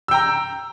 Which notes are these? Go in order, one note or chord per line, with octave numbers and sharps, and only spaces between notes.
G5 A#5 E6